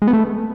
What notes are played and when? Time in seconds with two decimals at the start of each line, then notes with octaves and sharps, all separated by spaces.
0.02 G#3
0.07 B3
0.13 A3